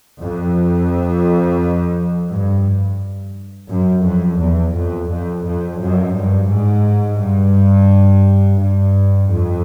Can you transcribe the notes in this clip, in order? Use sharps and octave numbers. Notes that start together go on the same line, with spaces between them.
F2
G2
F#2
F2
E2
F2
F2
F2
F#2
G2
G#2
G2
G2
F2